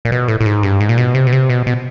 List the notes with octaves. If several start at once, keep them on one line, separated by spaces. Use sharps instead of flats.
A#2
B2
A2
A2
G#2
G2
G#2
A#2
B2
C3
B2
C3
B2
B2